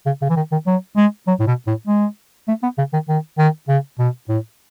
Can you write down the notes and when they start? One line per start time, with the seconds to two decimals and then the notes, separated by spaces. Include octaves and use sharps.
0.06 C#3
0.22 C#3
0.29 E3
0.36 D#3
0.52 D#3
0.67 F#3
0.97 G#3
1.27 F#3
1.40 A2
1.47 B2
1.67 A2
1.87 G#3
2.48 A3
2.63 B3
2.78 C#3
2.93 D#3
3.09 D#3
3.38 D#3
3.68 C#3
3.99 B2
4.29 A2